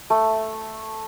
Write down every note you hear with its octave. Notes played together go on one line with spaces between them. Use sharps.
A3